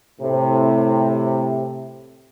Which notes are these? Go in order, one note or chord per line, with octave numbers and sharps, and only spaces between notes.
A2 C3